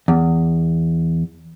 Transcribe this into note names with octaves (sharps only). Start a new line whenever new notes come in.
E2